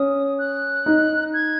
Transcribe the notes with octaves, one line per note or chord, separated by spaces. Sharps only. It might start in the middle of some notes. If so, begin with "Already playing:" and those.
Already playing: C#4 D#6
F#6
D#4
G#6